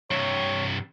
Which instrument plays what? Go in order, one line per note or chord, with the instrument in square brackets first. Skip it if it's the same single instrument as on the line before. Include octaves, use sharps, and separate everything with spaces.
[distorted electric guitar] G2 C3 [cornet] C#5